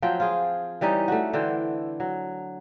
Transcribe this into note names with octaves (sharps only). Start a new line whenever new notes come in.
F3 F#3 C4 G5
F4 G#4
E3 G3 C#4 D#4
A3 F#4
D3 E3 C5 G5
F#3